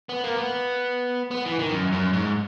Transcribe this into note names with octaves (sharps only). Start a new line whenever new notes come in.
B3
A#3
B3
B3
E3
D#3
F#2
F#2
G#2